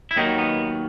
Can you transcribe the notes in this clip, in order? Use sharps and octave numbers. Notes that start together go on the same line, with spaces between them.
E4
D#2 D#3 F#3 D#4
B3